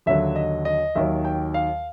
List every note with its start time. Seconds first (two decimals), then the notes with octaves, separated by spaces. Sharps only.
0.06 D#2 D3 F#3 E5
0.36 D#5
0.65 D#5
0.95 D#2 D#3 F#3 E5
1.24 G5
1.54 F5